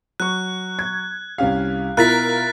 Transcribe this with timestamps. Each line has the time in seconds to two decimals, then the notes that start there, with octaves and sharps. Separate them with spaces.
0.20 F#3 C#6 F#6
0.79 G#6
1.38 C2 C#4 G4 F5
1.97 B2 E4 F4 A#4 F#6 A6 B6